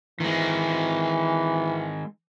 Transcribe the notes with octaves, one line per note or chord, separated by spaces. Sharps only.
D#3 E3 G#3